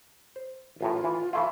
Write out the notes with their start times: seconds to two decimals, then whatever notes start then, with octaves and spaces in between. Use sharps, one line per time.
0.36 C5
0.81 A1 F#2 A2 F4
1.04 E3
1.33 E3 A3 F4 E5